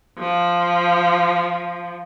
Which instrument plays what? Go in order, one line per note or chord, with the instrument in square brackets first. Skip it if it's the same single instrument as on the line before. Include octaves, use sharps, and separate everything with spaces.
[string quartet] F3